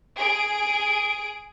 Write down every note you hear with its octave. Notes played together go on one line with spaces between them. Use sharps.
G#4 D7